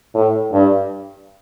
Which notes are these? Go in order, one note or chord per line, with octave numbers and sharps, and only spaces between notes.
A2
G2